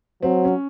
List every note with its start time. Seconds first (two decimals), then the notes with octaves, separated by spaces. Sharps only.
0.23 F#3 C4
0.45 C#4